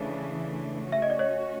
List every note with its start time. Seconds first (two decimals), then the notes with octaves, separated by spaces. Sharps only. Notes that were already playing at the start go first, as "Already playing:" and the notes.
Already playing: C#3 E3 A3 D4
0.92 A3 C#4 F#4 E5
1.02 D#5
1.10 D5
1.19 C#5 D#5